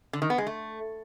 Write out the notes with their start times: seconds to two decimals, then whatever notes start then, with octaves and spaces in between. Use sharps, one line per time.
0.13 D3
0.22 D#3
0.30 B3
0.38 G#3
0.47 A3